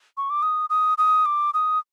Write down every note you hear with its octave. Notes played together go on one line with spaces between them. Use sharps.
C#6
D6
D#6
D#6
D#6
D6
D#6